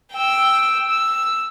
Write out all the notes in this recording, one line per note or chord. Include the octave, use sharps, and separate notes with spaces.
G5 E6
E6